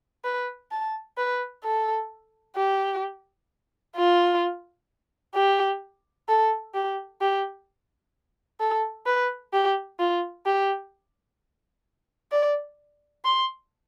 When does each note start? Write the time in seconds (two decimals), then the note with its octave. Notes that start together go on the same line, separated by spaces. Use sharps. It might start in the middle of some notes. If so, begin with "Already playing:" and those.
0.24 B4
0.71 A5
1.18 B4
1.64 A4
2.56 G4
3.97 F4
5.35 G4
6.29 A4
6.74 G4
7.21 G4
8.60 A4
9.06 B4
9.53 G4
9.99 F4
10.46 G4
12.32 D5
13.25 C6